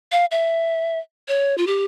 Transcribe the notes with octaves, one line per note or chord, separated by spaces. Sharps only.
F5
E5
C#5
F4
G4